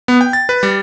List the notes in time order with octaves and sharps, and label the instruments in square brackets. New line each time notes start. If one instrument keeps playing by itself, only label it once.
[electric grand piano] B3
G5
A6
B4
G3